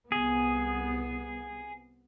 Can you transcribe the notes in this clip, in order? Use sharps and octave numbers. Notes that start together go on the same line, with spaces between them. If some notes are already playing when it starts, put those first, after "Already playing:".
C2 B3 G#4